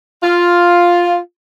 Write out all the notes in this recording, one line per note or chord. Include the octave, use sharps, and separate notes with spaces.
F4